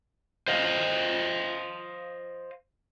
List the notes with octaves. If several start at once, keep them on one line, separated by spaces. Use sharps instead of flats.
C5 D#5 F5